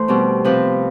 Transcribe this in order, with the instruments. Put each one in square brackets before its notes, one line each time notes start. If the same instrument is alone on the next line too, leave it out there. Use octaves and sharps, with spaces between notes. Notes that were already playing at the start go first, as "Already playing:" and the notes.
Already playing: [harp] E3 A3 C5
B2 G3 C4
C3 F3 C4 B4